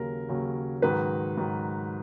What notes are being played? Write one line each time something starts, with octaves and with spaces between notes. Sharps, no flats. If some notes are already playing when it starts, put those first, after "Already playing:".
Already playing: D#2 C#3 F#3 A#4
D#2 C#3 F#3
G#2 D#3 F#3 B4
G#2 D#3 F#3